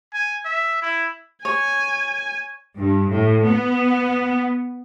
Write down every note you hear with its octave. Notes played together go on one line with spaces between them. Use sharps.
G#5
E5
E4
C#5 G#5
G2
A2
B3